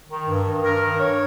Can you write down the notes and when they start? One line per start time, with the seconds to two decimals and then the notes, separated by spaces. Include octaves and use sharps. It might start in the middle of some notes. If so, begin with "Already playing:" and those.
0.09 D#3
0.27 G2
0.45 D#3
0.63 G2 A#4
0.81 D#3
0.99 G2 C#5